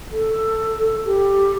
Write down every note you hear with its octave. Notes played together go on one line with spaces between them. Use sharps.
A4
G4